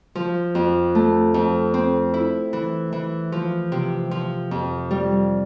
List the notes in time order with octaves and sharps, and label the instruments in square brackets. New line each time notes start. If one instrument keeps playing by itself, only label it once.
[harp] F3
F2
A3
F2
C4
E4
E3
E3
F3
C3
F3
F2
G3